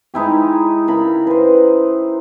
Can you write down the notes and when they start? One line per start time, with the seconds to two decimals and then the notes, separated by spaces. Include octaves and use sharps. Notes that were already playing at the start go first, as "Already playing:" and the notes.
0.14 G#3 D#4 E4 G4
0.88 C#3 A#4 B5
1.27 B4 C5